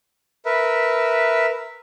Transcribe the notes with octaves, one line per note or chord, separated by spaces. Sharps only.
A#4 B4 E5